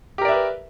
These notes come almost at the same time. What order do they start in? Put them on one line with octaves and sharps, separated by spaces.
G4 A#4 D5 E5 B4